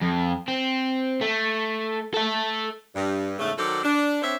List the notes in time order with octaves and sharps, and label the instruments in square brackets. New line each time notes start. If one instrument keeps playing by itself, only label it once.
[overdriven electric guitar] F2
C4
A3
A4 E5
[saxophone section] G2
E2 G#2 C#3 A3
D#3 F#3 F#4 A4 C5 D5
D4
C4 D4 C5 C#5 E5